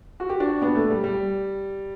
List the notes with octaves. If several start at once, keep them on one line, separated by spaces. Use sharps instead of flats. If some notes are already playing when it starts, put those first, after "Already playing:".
F#4
G4
D4 F#4
B3 D4
A3
G3
G3